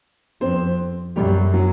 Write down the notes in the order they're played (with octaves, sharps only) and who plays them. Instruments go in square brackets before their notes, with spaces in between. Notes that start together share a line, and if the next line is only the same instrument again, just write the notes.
[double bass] F2 [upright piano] C4 C5
[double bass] F#2 [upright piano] G3 G4
[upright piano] F#3 F#4